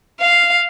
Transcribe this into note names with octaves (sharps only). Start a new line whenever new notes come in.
F5